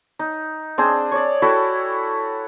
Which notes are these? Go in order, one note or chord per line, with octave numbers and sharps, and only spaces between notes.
D#4
C4 D4 G#4 C5
C#5 D5
E4 F#4 A4 G5